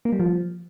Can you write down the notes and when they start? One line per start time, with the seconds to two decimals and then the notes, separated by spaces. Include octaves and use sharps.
0.05 A#3
0.12 G3
0.19 F3